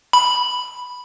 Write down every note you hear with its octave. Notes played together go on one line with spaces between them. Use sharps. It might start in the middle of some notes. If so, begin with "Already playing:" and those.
B5